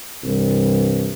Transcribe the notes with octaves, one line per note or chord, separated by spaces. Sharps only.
C2 G2 E3 G3